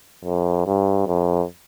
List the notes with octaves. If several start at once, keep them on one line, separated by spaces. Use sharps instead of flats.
F2
G2
F2